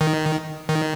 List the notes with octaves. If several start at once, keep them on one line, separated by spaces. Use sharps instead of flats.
D#3
D#3